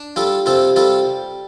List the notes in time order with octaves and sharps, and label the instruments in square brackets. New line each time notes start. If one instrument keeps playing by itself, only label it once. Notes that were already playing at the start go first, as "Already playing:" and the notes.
Already playing: [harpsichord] D4
G3 F4 A4
C3 F4 A4
G3 F4 A4